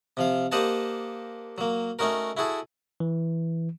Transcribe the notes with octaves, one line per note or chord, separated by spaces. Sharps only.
C3 F3 F5
A#3 G4 C5 D#5 F#5 A5
F#3 A#3
A3 C#4 D#4 F#4 A#4
E4 F#4 G#4 A4
E3